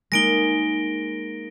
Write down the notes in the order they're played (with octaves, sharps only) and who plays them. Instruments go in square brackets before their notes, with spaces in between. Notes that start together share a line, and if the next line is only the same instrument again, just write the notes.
[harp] G#3 A#3 D#4 [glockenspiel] A#6 D7 G7